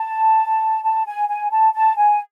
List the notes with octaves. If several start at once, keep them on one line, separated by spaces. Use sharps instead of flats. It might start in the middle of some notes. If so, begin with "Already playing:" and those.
Already playing: A5
A5
G#5
G#5
A5
A5
G#5